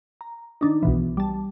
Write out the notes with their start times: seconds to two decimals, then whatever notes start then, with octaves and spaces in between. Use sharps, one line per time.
0.21 A#5
0.61 D#3 D4 D#4
0.83 B1 B2 E3
1.17 G3 A5